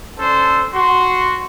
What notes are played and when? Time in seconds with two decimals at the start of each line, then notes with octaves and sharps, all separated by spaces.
0.18 C#4 D4 A4 C5
0.73 F#4 C6